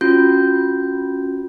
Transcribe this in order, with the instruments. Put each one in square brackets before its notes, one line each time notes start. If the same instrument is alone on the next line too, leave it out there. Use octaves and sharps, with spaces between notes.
[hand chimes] C#4 F4 F#4 G6